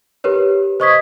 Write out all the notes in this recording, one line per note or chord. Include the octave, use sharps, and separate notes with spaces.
G4 A#4 B4 C#5
C5 D#5 C#6 D#6 G#6 B6